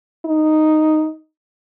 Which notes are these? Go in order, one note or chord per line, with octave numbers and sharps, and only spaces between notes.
D#4